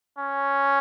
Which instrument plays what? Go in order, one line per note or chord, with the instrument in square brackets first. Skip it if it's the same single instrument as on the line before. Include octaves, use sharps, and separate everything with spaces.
[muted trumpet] C#4